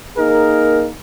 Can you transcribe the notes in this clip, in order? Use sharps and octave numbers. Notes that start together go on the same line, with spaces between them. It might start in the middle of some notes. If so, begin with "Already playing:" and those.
A#3 D#4 G#4 A#4